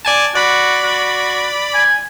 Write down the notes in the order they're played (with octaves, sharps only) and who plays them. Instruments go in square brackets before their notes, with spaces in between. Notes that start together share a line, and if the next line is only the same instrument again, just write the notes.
[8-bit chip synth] D5 G#5 A5
[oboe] F#4 [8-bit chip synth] D5 B5
[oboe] F#4
G#5